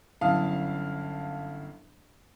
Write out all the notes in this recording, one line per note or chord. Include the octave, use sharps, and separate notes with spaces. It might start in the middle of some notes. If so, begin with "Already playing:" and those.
G1 F#2 E4 F5 A5 D#6